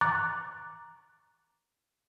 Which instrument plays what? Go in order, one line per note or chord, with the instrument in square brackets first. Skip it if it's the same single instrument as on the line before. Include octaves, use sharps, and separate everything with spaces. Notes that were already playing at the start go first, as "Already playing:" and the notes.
[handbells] A#5 C#6 D6 F#6 A6